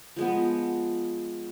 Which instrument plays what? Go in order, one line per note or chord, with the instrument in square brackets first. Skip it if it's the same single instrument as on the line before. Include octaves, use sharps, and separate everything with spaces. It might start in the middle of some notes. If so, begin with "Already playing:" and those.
[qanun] F3 G#3 B3